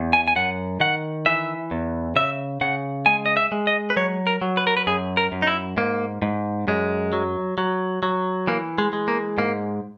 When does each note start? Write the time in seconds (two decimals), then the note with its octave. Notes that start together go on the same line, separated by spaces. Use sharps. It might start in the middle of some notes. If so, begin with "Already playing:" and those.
Already playing: E2
0.13 G#5
0.28 G#5
0.36 F#2 F#5
0.80 D#3 F#5
1.26 E3 E5
1.71 E2
2.16 C#3 E5
2.61 C#3 F#5
3.06 G#3 G#5
3.26 D#5
3.37 E5
3.52 G#3
3.67 D#5
3.90 B4
3.96 F#3 C#5
4.27 A#4
4.42 F#3
4.57 B4
4.67 A#4
4.77 B4
4.87 F#2 G#4
5.17 A#4
5.32 F#2
5.42 D#4
5.47 E4
5.77 G#2 A#3
6.22 G#2
6.68 F#2 G#3
7.13 F#3
7.58 F#3
8.03 F#3
8.47 E3 A#3
8.78 G#3
8.93 G#3
9.08 A#3
9.38 G#2 A#3